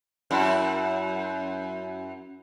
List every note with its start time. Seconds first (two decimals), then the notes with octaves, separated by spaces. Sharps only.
0.31 F#2 E4